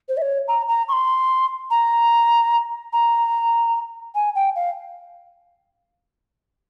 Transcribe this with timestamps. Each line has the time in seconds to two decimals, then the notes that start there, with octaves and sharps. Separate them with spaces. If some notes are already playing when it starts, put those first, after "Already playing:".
0.09 C5
0.17 E5
0.22 C#5
0.48 A#5
0.68 A#5
0.88 C#6
0.92 C6
1.71 A#5
2.93 A#5
4.15 G#5
4.35 G5
4.56 F5